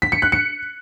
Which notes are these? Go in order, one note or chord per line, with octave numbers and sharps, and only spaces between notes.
B6
C#7
F#6
C#7